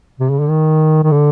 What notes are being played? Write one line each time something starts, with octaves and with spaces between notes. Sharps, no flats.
C3
C#3
D3
D#3
D#3
D3